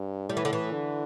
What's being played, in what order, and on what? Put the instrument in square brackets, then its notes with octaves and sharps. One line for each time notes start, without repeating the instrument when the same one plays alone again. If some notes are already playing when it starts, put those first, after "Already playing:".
Already playing: [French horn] G2
[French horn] A2 [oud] G3
[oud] E3
D3
E3
[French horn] D3